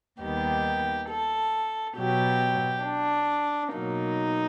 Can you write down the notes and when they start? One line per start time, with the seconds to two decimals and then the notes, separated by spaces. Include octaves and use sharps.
0.21 D#2 D#3 G3 B3 G4
1.09 A4
1.96 B2 F#3 B3 G4
2.84 D4
3.72 B2 F#3 A#3 D#4